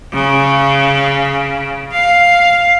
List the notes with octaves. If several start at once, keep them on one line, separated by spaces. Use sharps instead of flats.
C#3
F5